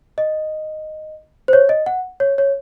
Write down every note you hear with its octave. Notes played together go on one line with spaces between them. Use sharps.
D#5
C5
C#5
D#5
F#5
C#5
C#5